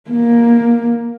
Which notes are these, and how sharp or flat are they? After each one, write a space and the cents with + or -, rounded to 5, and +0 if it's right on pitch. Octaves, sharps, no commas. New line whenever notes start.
A#3 +10